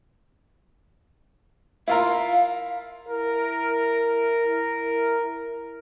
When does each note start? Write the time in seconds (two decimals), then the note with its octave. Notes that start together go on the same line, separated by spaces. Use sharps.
1.88 E4 F4 A#4 F5
3.08 E4 A#4